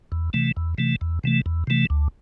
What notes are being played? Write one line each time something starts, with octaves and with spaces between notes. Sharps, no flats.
E2
C3 E3 A3
E2
C3 E3 A3
E2
C3 E3 A3
E2
C3 E3 A3
D2